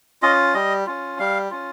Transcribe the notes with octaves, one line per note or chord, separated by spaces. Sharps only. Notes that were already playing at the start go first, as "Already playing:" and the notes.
C#4 F4 D#5
G3 D#5
C#4 F4
G3 F5
C#4 F4